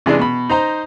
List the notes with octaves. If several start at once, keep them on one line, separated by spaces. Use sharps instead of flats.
C3 E3 G#3 D4
B2 B5
D#4 C5 A#5